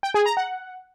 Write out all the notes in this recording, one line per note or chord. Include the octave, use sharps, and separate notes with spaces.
G5
G#4
A#5
F#5